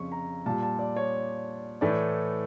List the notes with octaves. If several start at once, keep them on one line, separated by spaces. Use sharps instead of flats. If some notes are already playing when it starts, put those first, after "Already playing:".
Already playing: F2 C#3 C#6
A#5
A#2 G3 A5
A5
D5
C#5
A2 E3 A3 D5